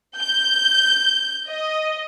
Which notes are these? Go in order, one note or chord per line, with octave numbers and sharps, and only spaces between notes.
G6
D#5